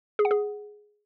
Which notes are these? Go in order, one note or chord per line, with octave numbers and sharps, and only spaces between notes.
G#4
F#5
G#4